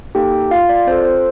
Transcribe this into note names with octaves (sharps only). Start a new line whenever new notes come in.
A#3 D#4 G4 A4 G5
F4 F5
D5
C4 F4 A4 C5
C5